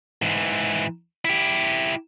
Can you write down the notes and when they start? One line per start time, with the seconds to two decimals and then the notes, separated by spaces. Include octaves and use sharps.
0.22 G#2 E3
1.25 E4 G4